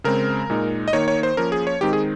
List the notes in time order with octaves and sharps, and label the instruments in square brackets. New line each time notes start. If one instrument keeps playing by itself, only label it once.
[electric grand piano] C#3 G#3 C4 A#4
A#2 G#3 D#4
D#5
D#3 A#3 D#4 C#5
C#5
C5
F3 A#3 C#4 A#4
G#4
C#5
D#3 G#3 C4 D#4 G4
G#4